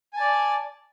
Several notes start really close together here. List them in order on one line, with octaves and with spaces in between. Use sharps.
G#5 A5 D5